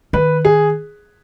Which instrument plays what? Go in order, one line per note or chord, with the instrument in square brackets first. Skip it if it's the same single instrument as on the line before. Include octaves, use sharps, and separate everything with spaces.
[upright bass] D#3 [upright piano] B4
[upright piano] G#4